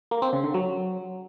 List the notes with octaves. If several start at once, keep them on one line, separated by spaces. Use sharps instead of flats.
A#3
C4
C#3
D3
F#3